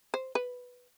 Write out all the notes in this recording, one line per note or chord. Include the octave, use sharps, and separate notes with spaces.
C5
B4